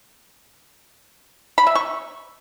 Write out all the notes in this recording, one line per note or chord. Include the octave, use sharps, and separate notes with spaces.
B5
E5
C#6